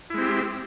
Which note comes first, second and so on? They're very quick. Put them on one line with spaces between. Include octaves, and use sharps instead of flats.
E4 G#3 C4 G4